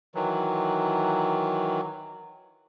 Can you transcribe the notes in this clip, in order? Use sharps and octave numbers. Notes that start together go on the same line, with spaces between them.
D#3 E3 F#3